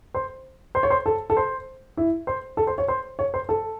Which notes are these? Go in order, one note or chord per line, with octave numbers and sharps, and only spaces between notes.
C5
C5
C#5
C5
A4
A4
C5
E4
C5
A4
C5
C#5
C5
C#5
C5
A4